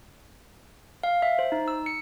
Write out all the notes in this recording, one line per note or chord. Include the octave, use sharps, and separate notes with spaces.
F5
E5
C5
D#4
E6
C#7